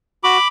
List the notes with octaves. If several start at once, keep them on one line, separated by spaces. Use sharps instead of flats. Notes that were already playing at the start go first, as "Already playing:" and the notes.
F#4 B5 D6